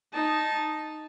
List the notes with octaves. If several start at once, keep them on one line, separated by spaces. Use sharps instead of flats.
D#4 A5